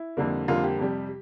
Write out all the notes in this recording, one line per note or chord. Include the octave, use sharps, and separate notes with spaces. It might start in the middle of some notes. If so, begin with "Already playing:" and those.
Already playing: E4
F2 D3 G3 A#3
F2 D3 G3 A#3 F4
G4
F2 C3 G3